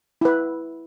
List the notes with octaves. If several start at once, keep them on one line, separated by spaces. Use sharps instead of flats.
E4 B4